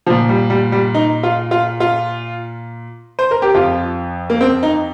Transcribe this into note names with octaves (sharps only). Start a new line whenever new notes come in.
F3
A#2
G3
G3
G3
D#4
F4
F4
F4
C5
A#4
G4
F2 F3 F4
A#3
C4
D#4